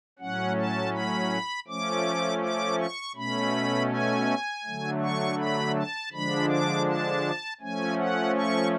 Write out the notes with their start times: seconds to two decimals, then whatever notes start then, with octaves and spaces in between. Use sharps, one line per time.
0.19 A2 F#3 C#4 F#5
0.57 A5
0.93 B5
1.68 F3 A3 C#4 D6
2.42 D6
2.79 C#6
3.16 B2 A3 C#4 B5
3.90 G#5
4.64 D3 F#3 A3
5.02 C#6
5.39 B5
5.76 A5
6.12 D3 F3 G#3 D4 B5
6.49 D6
6.87 A5
7.61 F3 A3 C#4 G#5
7.98 F#5
8.35 C#6